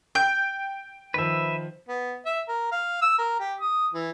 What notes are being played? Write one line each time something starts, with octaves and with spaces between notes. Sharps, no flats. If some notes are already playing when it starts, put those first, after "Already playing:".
G5 G6
D#3 F3 B4 E5
B3
E5
A#4
F5
E6
A#4
G4
D#6
E3